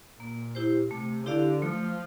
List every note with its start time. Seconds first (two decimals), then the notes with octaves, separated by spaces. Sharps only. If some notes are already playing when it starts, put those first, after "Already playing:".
0.19 A#2 A#3
0.55 E4 G4 C5
0.91 C3 A3
1.26 D3 E4 G4 D5 F5
1.62 F3 A3